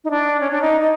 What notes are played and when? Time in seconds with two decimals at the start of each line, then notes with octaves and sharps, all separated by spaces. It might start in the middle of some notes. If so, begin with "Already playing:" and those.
0.04 D#4
0.10 D4
0.40 C#4
0.51 D4
0.61 D#4
0.80 D#4